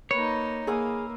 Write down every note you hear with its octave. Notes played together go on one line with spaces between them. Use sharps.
A#3 D#4 B4 C#5
A#3 G#4 E5 F5 D#6